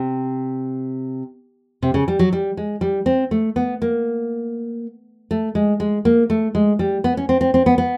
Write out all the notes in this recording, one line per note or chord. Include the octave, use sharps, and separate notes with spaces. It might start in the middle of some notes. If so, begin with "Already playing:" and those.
Already playing: C3
C3
C#3
G3
F#3
G3
G#3
G3
C4
A3
B3
A#3
A3
G#3
G#3
A#3
A3
G#3
G3
B3
C#4
C4
C4
C4
B3
B3